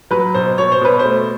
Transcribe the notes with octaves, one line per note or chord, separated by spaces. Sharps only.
F#3 B4
B2 C5
B2 C#5
C5
B2 B4
C5
A3